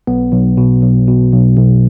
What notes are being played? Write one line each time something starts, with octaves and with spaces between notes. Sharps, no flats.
B1 B3
B1
B2
B1
B2
B1
B1